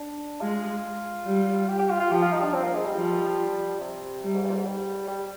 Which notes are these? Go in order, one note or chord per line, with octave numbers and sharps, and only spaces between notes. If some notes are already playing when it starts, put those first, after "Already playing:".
Already playing: D4
G#3 F4
G3
G4
G4
F4
F4
F3 G4
F4
D#4
D4
C4
A#3
G#3
G3
F3
C3
G3
G#2
G2
A#2
G#2
G3
G3